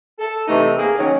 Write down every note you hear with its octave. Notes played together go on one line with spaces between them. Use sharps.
A4
C3 E3 A3 D#4
A#3 G#4
D#3 F#3 C#4